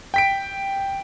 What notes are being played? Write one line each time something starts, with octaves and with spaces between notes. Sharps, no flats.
G5 B6 D7